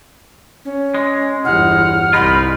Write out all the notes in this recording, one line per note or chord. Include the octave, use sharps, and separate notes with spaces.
C#4
G#3
G1 E2 F#5 F6
C2 G#3 D#4 F4 B5